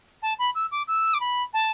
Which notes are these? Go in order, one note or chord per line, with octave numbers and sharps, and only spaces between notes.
A5
B5
E6
D6
E6
D6
B5
A5